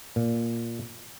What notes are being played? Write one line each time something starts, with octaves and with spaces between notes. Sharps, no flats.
A#2